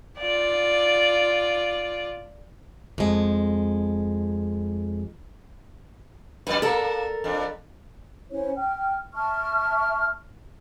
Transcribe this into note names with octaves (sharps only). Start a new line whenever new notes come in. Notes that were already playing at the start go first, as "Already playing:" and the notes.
F4 D5
F2 G#3
F#2 B2 B4 D5
A#3 A4 A#4
F2 D4
C#4 E4 C5 C#5
G5 F6
E5 A5 C#6 F6